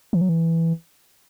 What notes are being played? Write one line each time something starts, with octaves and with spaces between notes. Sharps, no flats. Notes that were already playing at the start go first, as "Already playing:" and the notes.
E3
F#3
E3